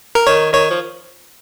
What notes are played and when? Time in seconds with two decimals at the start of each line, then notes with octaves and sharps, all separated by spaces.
0.15 A#4
0.27 D#3 C#5
0.52 D#3 C#5
0.70 F3